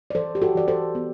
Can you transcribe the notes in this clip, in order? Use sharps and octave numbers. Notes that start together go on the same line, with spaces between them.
D5
E3 A4 C5
G4
F#4 A4
E3 D5
A4 C5
B3